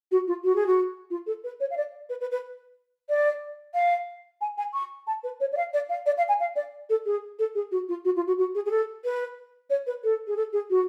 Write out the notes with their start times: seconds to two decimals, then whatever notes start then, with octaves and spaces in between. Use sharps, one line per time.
0.11 F#4
0.27 F4
0.44 F#4
0.55 G#4
0.66 F#4
1.10 F4
1.26 A4
1.44 B4
1.60 C#5
1.70 F5
1.77 D5
2.09 B4
2.21 B4
2.31 B4
3.09 D5
3.74 F5
4.41 G#5
4.57 G#5
4.73 C#6
5.07 A5
5.23 B4
5.40 C#5
5.52 D5
5.57 F5
5.73 D5
5.89 F5
6.06 D5
6.17 F5
6.28 G#5
6.40 F5
6.56 D5
6.89 A4
7.05 G#4
7.39 A4
7.55 G#4
7.71 F#4
7.88 F4
8.05 F#4
8.16 F4
8.27 F#4
8.38 F#4
8.55 G#4
8.65 G#4
8.71 A4
9.04 B4
9.70 C#5
9.87 B4
10.04 A4
10.27 G#4
10.36 A4
10.53 G#4
10.70 F#4